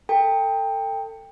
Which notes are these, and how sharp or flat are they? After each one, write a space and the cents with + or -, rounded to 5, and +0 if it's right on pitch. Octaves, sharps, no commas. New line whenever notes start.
A4 +30 G5 +20